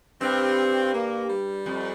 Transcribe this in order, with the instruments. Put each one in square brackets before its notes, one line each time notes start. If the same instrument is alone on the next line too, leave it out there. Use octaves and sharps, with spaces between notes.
[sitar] G2 [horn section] C4
[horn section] A#3
G3
[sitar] F2